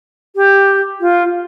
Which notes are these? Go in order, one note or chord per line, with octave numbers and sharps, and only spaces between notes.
G4
F4